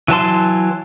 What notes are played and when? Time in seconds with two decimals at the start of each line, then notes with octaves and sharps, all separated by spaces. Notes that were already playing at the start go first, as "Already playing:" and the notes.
0.08 E3 F#3 A5 C6